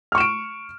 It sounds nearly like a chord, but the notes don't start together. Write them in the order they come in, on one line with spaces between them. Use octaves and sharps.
F6 C#6 E7 D7